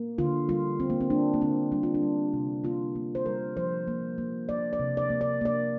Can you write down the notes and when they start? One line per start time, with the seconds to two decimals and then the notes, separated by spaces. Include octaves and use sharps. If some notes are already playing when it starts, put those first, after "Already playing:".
Already playing: A#3
0.18 D3 F4
0.49 G3 F4
0.80 D3 C4
0.90 A#3
1.01 C4
1.10 A#3 D4
1.34 A#3
1.41 D3 C4
1.72 G3 D4
1.83 F4
1.94 D4
2.03 G3
2.34 C3
2.64 A#3 F4
2.95 A#3
3.15 C5
3.26 G3 A#4
3.57 F3 C5
3.88 A#3
4.18 A#3
4.49 A#3 D5
4.73 D5
4.80 C3
4.97 D5
5.10 A#3
5.21 D5
5.41 A#3 D5